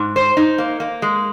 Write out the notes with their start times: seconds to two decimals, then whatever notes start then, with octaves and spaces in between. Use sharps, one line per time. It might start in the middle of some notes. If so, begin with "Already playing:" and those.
Already playing: G#2
0.16 C5
0.37 D#4
0.58 A#3
0.80 A#3
1.02 G#3